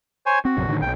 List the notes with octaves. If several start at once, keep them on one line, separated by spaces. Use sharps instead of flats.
C5 C#5 G#5
C4 F#4
A#1 F#2 C3
A2 D3 D#3
B1 G5